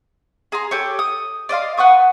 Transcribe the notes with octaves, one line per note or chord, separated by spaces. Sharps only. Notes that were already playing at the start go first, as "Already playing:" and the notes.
G#4 A#5 C6
G4 A4 C#5
D#6
D5 D#5 F5 C6
B4 F#5 C#6 D#6